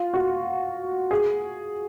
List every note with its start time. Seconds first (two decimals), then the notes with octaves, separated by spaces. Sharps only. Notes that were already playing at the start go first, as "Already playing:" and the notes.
Already playing: F4
0.14 F#4
1.11 G#4